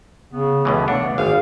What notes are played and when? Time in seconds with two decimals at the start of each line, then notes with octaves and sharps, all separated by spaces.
0.33 C#3 B3
0.65 C#2 B2 E3 A3
0.88 D4 F#5
1.18 G#1 G#4 F5